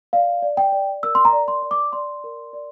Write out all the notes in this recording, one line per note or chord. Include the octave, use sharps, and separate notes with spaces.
D5 F5
D5
G5
D5
A#4 E6
C6
A#5
D5
C6
D5
D6
D5 C6
A#4
D5